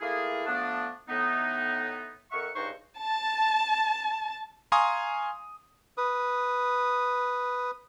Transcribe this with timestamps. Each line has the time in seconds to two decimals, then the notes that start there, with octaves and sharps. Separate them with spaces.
0.01 A3 A#3 E4 F4 G#4
0.47 F3 A3 B3 D4
1.09 A2 B3 D#4
2.32 F2 A#4 E5 F#5 C#6
2.55 C#2 G2 D#4 F#4 C5 C#6
2.99 A5
4.72 F5 G#5 A#5 C6 C#6 D#6
5.98 B4 D#6